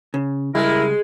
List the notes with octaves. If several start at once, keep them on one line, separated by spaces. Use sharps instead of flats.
C#3
C#2 G2 G3 G#3 E4 A#4